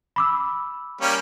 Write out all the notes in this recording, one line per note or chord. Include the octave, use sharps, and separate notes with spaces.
B5 D6 E6
G3 A#3 C#4